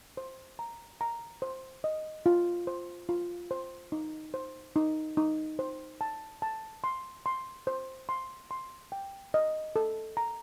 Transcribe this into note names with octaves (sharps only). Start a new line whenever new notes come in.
C5
A#5
A#5
C5
D#5
F4
C5
F4
C5
D#4
C5
D#4
D#4
C5
A5
A5
C6
C6
C5
C6
C6
G5
D#5
A4
A#5